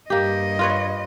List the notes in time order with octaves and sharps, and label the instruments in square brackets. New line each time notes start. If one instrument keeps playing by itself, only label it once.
[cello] G2 D#5 [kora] A#3 G4
[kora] F4 B4 C#5